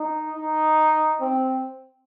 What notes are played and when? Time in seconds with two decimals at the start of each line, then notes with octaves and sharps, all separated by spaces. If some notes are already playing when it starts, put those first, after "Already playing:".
Already playing: D#4
0.36 D#4
1.21 C4